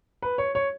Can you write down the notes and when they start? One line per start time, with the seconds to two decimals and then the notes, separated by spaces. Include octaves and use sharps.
0.22 B4
0.38 C#5
0.55 C#5